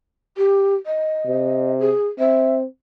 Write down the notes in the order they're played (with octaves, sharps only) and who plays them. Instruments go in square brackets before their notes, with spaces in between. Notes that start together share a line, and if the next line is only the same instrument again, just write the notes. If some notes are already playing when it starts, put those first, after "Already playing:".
[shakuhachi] G4
D#5
[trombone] C3
[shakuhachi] G#4
[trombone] C4 [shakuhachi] E5